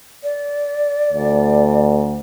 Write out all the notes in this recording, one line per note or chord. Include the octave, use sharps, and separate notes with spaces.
D5
D2